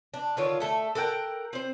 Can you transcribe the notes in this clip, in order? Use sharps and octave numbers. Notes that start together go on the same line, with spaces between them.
D4
D3 D#3 F4 C#5
A3 A4
A4 A#4 F#5 G5
C4 C5